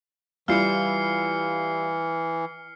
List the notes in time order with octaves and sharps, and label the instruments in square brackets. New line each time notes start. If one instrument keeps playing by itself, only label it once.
[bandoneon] E3 [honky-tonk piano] G3 E4 F4 [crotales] F6 C7 C#7